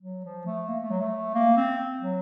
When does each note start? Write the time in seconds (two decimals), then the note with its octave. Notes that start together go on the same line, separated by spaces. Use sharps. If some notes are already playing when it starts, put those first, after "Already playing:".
0.01 F#3
0.24 F3
0.46 A3
0.68 A#3
0.79 A3
0.90 F#3
1.01 A3
1.34 A#3
1.57 C4
2.01 F#3